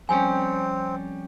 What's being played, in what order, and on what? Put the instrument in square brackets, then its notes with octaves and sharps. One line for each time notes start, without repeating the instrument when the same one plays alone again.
[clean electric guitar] F2 G3 C#4 [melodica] C4 [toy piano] G#5